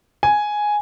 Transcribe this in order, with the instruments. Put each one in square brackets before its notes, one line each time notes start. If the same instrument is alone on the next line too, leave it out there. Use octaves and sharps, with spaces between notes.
[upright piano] G#5